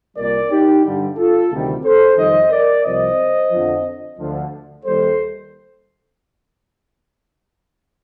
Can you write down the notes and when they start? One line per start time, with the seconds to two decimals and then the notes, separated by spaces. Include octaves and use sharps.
0.16 C2 A#2 G3 A#4 D5
0.50 D#4 G4
0.83 G2 D3 G3
1.17 F4 A4
1.51 D2 C3 D#3 G3
1.83 A4 C5
2.17 F2 C3 D#3 G3 C5 D#5
2.50 A#4 D5
2.84 C2 C3 F3 C5 D#5
3.51 F2 D3 F3
4.18 D2 D3 F3
4.85 D#2 D#3 G3 A4 C5